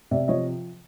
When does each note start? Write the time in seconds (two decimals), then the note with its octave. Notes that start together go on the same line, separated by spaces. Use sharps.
0.11 C3 D5 E5
0.28 F3 C#5 D#5